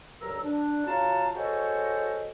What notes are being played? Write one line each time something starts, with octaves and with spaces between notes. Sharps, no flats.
D2 G2 F#3 A#4 A#5 E6
D4
C#3 F4 F#4 F5 A5 A#5
F#4 G#4 A4 C5 C#5 D#5